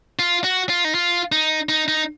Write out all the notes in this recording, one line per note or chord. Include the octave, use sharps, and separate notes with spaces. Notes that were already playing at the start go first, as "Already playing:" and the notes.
F4
F#4
F4
D#4
F4
D#4
D#4
D#4